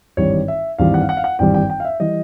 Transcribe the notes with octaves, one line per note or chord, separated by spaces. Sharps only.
G#1 G2 E3 G3 C#5
E5
G#1 G2 E3 G3 F5
F#5
F5
F#5
F5
F#5
G#1 G2 E3 G3 G5
G5
G5
F5
E5
E3 G3 D#5